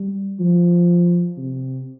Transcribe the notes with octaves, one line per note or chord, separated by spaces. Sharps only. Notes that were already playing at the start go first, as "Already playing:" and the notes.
Already playing: G3
F3
C3